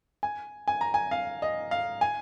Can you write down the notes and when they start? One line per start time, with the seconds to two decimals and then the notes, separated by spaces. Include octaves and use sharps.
0.23 G#5
0.68 G#5
0.81 A#5
0.94 G#5
1.11 F5
1.42 D#5
1.71 F5
2.01 G#5